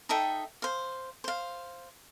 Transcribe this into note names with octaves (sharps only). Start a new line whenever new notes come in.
D#4 A4 E5 G5
C5 F5
C5 F5